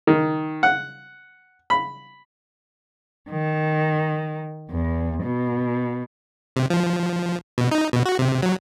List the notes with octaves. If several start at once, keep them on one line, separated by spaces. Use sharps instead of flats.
D#3
F#5
B5
D#3
E2
B2
C3
F3
B2
D#4
B2
F#4
C3
F#3